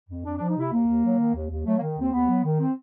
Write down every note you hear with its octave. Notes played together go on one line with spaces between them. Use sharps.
F2
F2 D4
D4
F3
D#4
C3 E4
D#2 A#3
D#2
F#3
D#3
D#2
D#2
F#3 A3
A#3
D#3
D#2 C4
D#2 B3
F#3
D#3
C4